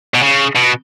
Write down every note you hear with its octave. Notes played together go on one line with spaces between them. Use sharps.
B2
C#3
B2